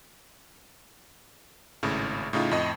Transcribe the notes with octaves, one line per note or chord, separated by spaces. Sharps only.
G#1 A2 C#3
A2 C#3 D#4 F4
F2 A2 D#5